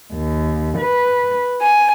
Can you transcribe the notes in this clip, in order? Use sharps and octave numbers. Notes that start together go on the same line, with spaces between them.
D#2
B4
G#5